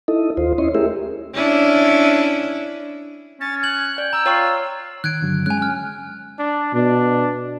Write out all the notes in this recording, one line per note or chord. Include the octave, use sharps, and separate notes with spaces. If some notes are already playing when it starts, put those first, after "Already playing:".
D#4 E4 A4 D#5
D#2 F4 C5
C#4 E4 C#5 D#5 C6
A3 E4 G4 G#4 A#4 E5
C#4 D4 E4
C#4 A6
F#6 G#6 F#7
D5 G5
A#5 E6
F4 C#5 G5 C#6
D#3 F#6 G#6 D7
G2 D3 F#3
G#3 C#4 G#5 F#6
G#5 F6
D4
B2 D4